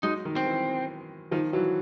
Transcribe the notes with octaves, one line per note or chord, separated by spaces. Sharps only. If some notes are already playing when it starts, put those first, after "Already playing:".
F#3 G#3 D#4
D#3
C4
E3
D#3 F3
E3 F#3